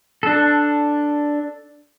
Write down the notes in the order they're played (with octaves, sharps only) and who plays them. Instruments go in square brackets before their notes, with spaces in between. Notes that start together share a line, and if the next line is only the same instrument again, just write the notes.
[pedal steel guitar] D4 A4